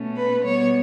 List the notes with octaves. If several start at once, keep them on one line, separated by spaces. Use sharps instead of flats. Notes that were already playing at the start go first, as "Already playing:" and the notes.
Already playing: B2 A3 C#4
B4
B2 G3 B3 C#5